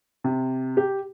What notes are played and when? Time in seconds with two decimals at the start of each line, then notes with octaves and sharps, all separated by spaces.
0.24 C3
0.77 G4